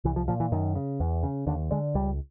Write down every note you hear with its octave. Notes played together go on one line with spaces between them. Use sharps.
C2 E3
F3
A#2 F3
E3
F#2 D#3
C#3
E2
C#3
D#2 D3
D3 G#3
C#2 G3